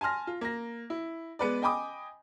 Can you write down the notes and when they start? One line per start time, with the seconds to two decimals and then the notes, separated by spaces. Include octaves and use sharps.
0.01 G#5 A5 C6 F6 A#6
0.27 F4
0.41 A#3 A#6
0.90 E4
1.39 G#3 B3 B4 D5
1.62 D#5 G5 G#5 B5 D6 D#6